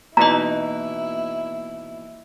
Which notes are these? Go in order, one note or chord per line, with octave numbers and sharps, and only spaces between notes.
B2 E3 A#3 D#4 E4 D#5 A#5